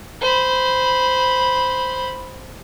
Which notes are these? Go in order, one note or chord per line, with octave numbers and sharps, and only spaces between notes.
C5 B5